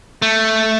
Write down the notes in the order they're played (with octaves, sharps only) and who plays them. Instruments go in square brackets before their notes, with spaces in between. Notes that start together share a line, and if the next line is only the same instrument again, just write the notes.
[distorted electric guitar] A3